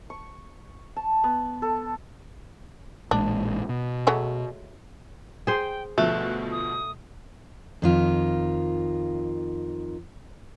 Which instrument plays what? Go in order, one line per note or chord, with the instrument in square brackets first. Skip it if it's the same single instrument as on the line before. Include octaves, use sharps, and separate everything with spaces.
[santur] C#6
A5
B3
A4
[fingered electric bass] A1 A#2 G#3 [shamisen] D4
[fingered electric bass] B2
[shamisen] F#3 G#3 A3
[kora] G#4 C5 [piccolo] G5
[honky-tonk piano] D2 B2 F3 [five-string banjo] A3 [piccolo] F#6
[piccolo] D#6
[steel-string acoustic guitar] F2 D#3 F4